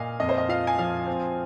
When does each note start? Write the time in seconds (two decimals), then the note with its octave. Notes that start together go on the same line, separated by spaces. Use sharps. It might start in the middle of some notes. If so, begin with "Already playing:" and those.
Already playing: A#2 D#5 F5 G#5
0.20 F2 D#5
0.29 C5
0.38 D#5
0.49 F4 F5
0.67 G#5
0.78 F3 F5
1.07 C4